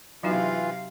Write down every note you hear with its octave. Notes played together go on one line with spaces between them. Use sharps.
C3 E3 F#3 D#4 F4 F#4 F5